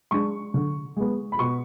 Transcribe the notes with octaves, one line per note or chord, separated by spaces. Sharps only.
G#3 D4 C#6
D3
G#3 B3
B5
B2 C#6